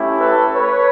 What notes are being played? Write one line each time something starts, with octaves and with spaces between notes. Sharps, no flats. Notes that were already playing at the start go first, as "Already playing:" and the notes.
Already playing: A3 C#4 E4 G4
A4 B4
B4 C#5